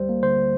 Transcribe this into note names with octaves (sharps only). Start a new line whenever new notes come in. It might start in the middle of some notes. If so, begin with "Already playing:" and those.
Already playing: D2 G3 C5
A#3
D3 C5